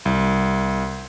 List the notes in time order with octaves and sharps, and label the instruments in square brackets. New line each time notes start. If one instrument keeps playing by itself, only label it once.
[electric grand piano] C2